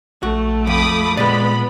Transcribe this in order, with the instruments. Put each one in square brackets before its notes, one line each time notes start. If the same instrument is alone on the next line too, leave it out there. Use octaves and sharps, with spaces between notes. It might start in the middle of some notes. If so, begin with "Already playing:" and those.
[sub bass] A#1 [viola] A3 [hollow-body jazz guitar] F#4
[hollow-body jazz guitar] F2 [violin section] B5 D6 D#6
[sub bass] A#2 [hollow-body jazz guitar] G#3 D5 [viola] B3 [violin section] B5